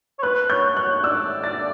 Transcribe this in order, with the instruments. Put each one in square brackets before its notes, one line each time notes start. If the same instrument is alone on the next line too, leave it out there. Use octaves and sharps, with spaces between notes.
[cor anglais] C#5
[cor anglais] B4 [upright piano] F#6
[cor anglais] C#5 [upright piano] G6
[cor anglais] C#5 [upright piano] F#6
[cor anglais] D5 [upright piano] E6
[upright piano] A6